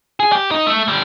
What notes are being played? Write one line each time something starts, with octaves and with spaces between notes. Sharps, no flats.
G#4
G4
D#4
A3
D3 G3